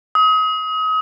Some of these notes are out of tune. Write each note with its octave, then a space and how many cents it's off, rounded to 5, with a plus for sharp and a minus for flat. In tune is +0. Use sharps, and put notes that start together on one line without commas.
D#6 +35